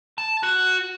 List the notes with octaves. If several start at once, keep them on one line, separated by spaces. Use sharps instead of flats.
A5
F#4